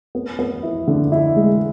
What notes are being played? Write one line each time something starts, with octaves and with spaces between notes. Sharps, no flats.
B3
B3
E4
D3
E4
G#3